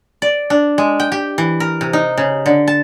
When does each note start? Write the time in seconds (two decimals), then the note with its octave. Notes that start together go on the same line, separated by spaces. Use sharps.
0.22 D5
0.50 D4
0.78 G#3
1.00 G5
1.12 G4
1.38 E3
1.60 A#4
1.81 C3
1.93 D#4
2.18 C#3
2.46 D3
2.68 A5